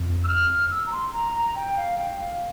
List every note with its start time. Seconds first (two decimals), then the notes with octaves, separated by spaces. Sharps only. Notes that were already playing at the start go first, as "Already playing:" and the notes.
Already playing: F2
0.24 E6
0.28 F6
0.71 E6
0.87 A#5
0.92 C6
1.13 A#5
1.35 A#5
1.55 G5
1.77 F5
1.98 G5
2.20 F5